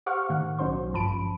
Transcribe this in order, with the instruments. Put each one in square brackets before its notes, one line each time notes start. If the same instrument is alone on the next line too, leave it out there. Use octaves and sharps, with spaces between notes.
[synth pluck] G4 C5 F5 F#5 C#6 F6
A2 D#3 F#5
B1 F#3 C#4 C5 C6
G#1 G2 F3 A5 B5 D7